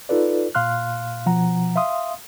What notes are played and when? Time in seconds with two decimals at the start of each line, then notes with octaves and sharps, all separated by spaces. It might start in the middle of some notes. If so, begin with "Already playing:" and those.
0.09 D#4 F4 A4 B4 D5
0.55 A#2 F5 C6 F6 F#6
1.26 B2 F3 F#5 A#5
1.76 E5 F5 C6 D#6